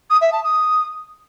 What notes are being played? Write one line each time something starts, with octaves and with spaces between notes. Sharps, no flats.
D#6
E5
A5
D#6